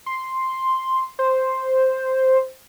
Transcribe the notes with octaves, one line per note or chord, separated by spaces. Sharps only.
C6
C5